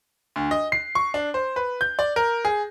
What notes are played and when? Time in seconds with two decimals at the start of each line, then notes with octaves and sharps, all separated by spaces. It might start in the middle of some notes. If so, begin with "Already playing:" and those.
0.36 D2
0.51 D#5
0.72 C7
0.95 C#6
1.14 D4
1.34 C5
1.56 B4
1.81 G6
1.99 D5
2.16 A#4
2.45 G#4